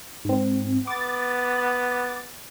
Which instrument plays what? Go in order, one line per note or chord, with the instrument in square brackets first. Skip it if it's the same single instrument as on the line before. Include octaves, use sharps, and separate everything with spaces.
[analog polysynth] G#2 C4
[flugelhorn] B3 [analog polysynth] D6 A6